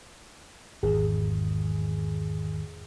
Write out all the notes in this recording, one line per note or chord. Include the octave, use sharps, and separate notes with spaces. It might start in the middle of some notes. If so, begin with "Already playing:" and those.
G#1 E2 G#4